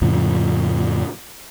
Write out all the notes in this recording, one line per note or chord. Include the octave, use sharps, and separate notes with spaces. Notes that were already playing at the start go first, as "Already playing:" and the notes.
F2 A2 C#3 F3